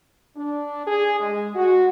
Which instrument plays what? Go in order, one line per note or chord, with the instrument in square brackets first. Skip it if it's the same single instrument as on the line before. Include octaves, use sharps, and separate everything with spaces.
[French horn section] D4
G#4
G#3
F#4